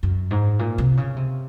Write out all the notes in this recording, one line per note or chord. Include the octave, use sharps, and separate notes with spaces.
F#2
G#2
A#2
C3
C#3
C3